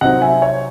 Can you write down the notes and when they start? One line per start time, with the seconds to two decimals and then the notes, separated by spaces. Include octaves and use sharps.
0.01 C3 F#3 C4 D#4 D#5 F#5
0.21 E5 G#5
0.42 C#5